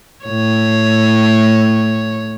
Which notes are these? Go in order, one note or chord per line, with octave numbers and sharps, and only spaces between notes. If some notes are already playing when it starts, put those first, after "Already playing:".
A2 C#5